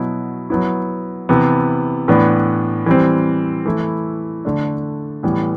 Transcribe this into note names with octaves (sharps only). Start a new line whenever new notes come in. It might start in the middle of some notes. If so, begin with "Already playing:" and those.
Already playing: B2 F#3 B3 E4
F#3 B3 E4
C3 E3 B3
A2 E3 B3 D4
E3 G3 C4
E3 A3 E4
D3 A3 D4
A2 E3 G3 B3